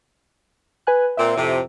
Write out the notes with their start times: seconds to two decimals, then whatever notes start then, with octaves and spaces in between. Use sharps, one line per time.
0.87 B4 G#5 F#6
1.17 A#2 C4 E5
1.36 F2 A2 C3